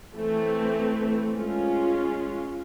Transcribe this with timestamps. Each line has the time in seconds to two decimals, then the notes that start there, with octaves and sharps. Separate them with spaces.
0.14 E3 A3 C4
1.34 G#3 C#4 F4